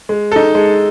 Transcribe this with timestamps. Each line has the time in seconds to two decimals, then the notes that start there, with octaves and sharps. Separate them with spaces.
0.09 G#3
0.32 D#4 A4
0.55 G#3